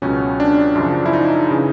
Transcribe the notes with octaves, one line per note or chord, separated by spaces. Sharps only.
C#2 B2 F#3 C#4
D4
F#2 C#3 F3
E4
D#4
C#3 E3